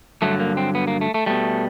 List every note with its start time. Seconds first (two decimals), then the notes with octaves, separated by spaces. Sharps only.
0.22 G2 D3 F#3 A3
0.40 A#3
0.57 C4
0.75 B3
0.87 A#3
1.01 A3
1.14 A3
1.26 B2 G3 A3